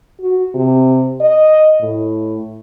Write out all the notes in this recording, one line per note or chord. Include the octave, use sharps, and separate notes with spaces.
F#4
C3
D#5
A2